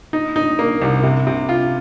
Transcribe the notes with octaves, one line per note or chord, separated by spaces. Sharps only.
D#4
D#4
A#3
C2
C3
C3
F4